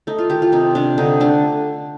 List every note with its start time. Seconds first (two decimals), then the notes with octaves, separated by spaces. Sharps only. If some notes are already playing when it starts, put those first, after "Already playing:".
0.07 A3 D#4
0.19 F4
0.30 D#3 G4
0.42 F4
0.52 C3 D#4
0.75 C3 D4
0.98 D3 D#4
1.20 A3 D4